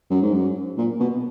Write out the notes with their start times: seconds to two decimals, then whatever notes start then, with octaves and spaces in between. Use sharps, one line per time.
0.10 F#2
0.22 G#2
0.33 F#2
0.77 A#2
1.00 B2